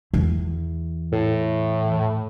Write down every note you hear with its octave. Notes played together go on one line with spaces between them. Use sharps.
E2
A2